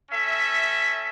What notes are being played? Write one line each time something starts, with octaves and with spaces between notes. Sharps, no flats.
C#4 A4 E5